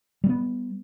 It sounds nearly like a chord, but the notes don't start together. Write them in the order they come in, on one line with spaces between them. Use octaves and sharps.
G3 C4 B3